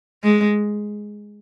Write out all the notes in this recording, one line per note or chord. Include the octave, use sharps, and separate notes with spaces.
G#3